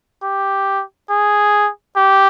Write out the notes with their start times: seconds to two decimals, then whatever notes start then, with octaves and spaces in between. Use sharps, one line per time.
0.23 G4
1.10 G#4
1.96 G4